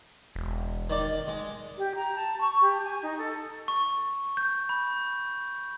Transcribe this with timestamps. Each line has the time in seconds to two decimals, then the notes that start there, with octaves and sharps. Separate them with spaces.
0.36 E1
0.90 D#3 D5
1.28 G#3
1.77 G4
1.95 A#5
2.15 A5
2.41 C#6
2.61 G4
2.83 G#5
3.02 D#4
3.18 A4
3.68 C#6
4.37 G6
4.69 B5